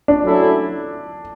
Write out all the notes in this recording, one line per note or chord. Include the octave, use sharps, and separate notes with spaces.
D4
F#3 A3 C#4 E4 A4